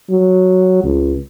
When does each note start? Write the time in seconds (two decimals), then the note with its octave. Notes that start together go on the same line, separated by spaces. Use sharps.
0.10 F#3
0.84 C#2